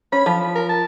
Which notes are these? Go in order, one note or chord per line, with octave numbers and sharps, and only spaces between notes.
C#4 B5
F3
A#4
A5